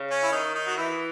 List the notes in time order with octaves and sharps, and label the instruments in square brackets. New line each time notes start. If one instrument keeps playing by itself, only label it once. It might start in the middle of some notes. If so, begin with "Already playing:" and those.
Already playing: [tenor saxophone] C#3
[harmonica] C#4
E4
[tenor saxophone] D#3 [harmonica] D#4
[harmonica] D#4
F#4
[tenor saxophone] E3 [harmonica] E4